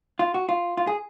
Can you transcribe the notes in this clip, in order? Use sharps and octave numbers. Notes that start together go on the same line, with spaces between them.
F4
F#4
F4
F4
G#4